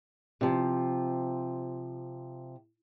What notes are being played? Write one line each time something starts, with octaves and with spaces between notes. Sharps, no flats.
C3 F3